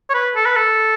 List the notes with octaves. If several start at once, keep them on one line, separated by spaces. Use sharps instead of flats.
C#5
B4
A4
B4
A4